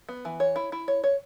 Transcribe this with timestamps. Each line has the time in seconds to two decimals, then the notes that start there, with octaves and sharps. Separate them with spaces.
0.09 B3
0.25 E3
0.40 C#5
0.56 E4
0.72 E4
0.88 C#5
1.04 C#5